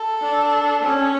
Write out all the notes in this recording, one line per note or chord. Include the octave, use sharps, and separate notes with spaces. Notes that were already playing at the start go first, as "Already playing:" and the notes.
Already playing: A4
D4
C#4